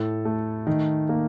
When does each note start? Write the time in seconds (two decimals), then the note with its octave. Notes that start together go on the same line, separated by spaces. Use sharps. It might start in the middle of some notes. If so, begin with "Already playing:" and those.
Already playing: A2 A4
0.25 A3
0.67 D#3
1.09 A#3